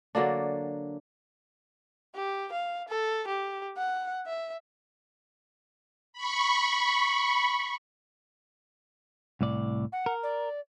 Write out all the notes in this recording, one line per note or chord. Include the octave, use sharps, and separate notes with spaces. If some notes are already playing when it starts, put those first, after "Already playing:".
D3 F#3 A#3 D4
G4
F5
A4
G4
F#5
E5
B5 C#6
C2 A2 D5
F#5
A#4
D5